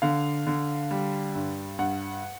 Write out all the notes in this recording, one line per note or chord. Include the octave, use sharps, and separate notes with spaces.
D3 F5
D3
G3
G2
G2 F#5